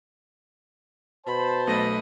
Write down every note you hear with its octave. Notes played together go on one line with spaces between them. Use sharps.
B2 C5 A5 B5
B1 A3 B4 D#5 A#6